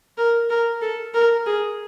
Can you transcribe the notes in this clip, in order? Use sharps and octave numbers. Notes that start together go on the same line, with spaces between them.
A#4
A#4
A4
A#4
G#4